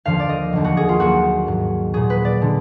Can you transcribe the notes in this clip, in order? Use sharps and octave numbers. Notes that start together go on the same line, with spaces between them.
D#2 D3 F3 F5
D5
D#5
D#2 D3 F#3
F#4
G#4
F4
D#2 D#3 F#3 F#4
G#2 F#3
A#2 F#3 G#4
B4
D5
D3 G#3